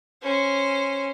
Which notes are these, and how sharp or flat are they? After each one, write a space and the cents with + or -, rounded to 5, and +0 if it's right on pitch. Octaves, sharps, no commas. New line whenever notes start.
C#4 -10 C5 -15